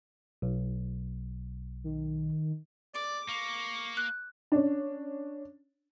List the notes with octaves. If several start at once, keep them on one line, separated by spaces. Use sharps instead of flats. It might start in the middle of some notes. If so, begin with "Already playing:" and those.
B1
D#3
D5 D6
A#3 C#6
F#6
C#4 D4